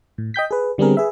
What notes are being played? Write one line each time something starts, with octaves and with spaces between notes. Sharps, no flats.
A2
D#5 G5 G6 B6
G#4 B4
D3 G3 B3 C4 G#4 A#4
G#4 B4 E5